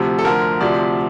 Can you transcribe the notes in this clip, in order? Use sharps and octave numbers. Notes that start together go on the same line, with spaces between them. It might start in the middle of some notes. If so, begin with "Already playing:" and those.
Already playing: D2 C3 F3
A4
D2 D3 F3 A#4
D2 C3 F3 D5